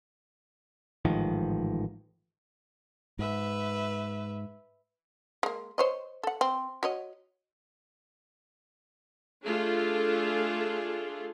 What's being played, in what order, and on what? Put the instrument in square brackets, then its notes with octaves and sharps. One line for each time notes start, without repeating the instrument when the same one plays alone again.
[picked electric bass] A1 G#2 D#3 F3
[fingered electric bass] G#2 [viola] B4 E5
[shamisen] G#3 A#3
C5 C#5 D#5
A4 F#5
C4
F#4 C#5 D#5
[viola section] A3 D4 F4 G#4 A4